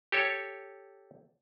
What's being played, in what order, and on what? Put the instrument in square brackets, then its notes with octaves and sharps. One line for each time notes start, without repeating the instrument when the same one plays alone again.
[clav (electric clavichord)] G4 A4 C#5